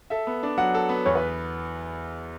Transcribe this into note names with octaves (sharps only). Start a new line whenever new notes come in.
A4 E5
B3
D4
F#3 F#5
A4
B3
E2 C#5
B4